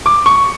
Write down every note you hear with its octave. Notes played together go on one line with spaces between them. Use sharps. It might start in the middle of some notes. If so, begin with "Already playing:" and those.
D6
C#6